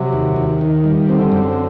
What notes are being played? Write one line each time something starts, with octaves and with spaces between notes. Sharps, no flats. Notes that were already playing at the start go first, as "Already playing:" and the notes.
Already playing: C3 F#3
D#2
D#2
D#3
G3
D3 C4
F#2